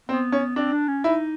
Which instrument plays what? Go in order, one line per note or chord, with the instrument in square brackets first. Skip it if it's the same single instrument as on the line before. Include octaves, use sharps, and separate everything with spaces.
[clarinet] B3 [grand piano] C4
[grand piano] C#4
[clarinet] C4 [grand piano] D4
[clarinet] D4
C#4
[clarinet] D#4 [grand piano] E4